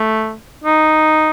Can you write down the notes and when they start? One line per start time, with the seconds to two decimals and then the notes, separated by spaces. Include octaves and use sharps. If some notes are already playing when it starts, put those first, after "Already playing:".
Already playing: A3
0.64 D#4